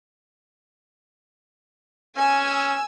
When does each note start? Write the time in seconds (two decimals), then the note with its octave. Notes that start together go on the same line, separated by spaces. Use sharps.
2.17 C#4 G#5 E6